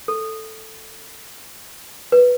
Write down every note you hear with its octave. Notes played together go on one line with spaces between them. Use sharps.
A4
B4